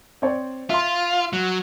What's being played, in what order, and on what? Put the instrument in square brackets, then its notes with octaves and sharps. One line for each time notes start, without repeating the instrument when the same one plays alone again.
[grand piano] C4 C#5 D5
[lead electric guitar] F4 [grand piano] E5 C6
[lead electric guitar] F#3